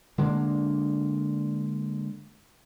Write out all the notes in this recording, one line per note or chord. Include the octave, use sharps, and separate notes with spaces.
D3 G#3 A#3 D4